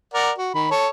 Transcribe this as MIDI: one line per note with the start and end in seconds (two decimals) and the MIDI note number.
0.14 0.31 70
0.14 0.31 74
0.14 0.31 78
0.38 0.49 66
0.54 0.69 51
0.54 0.69 83
0.71 0.88 69
0.71 0.88 73